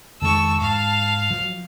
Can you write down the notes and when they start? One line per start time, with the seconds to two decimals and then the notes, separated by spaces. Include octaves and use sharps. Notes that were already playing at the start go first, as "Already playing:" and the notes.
0.22 F2 D#3 G#3 A5 C#6 E6
0.61 G#2 F5
1.31 F3 F#3